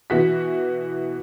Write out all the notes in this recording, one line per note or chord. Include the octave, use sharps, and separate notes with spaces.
B2 E3 F#4 B6